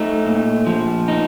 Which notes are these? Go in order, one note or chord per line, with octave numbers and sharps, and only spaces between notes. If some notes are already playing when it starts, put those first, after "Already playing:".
Already playing: A3 D#4
A#2
F3
D#4